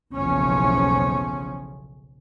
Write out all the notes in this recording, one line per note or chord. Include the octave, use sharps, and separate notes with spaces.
F#1 B1 E2 C#3 F3 C#4